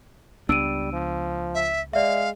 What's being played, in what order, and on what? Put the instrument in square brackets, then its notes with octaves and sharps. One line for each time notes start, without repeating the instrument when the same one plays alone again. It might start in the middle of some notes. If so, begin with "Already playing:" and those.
[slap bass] C#2 B3 D4 [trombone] G3 [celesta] E6 D7 D#7
[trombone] F3
[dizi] E5
[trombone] G#3 [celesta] D5 E5 [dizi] F5